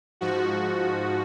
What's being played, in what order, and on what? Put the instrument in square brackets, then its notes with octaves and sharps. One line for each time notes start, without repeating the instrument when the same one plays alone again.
[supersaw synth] G#2 F3 F#4